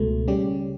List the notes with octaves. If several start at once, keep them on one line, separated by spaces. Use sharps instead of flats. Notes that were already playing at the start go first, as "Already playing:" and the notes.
Already playing: C#2 B2 A3
C#3 G3 C#4 G4